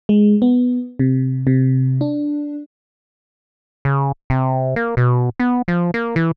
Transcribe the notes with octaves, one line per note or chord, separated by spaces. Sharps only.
G#3
B3
C3
C3
D4
C#3
C3
A#3
B2
B3
F3
A#3
E3